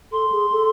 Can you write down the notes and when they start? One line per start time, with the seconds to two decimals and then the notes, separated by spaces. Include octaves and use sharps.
0.12 A4 C6
0.32 G#4
0.52 A4